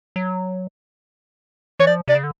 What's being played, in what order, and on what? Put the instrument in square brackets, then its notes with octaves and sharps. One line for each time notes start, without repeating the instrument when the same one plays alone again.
[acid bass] F#3
[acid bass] E3 [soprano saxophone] C#5
[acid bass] F3 [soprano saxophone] D5
[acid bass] C3 [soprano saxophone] D5
[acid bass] C#3
D3